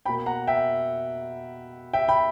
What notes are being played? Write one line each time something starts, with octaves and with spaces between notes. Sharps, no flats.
B2 A#3 G5 B5
F#5 A#5
E5 G5
E5 G5
G5 B5